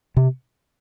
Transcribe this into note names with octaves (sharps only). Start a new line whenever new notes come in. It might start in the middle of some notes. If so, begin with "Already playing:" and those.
C3